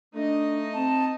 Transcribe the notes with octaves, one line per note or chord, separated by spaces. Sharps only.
A3 D4 D#4 D#5
C4 A5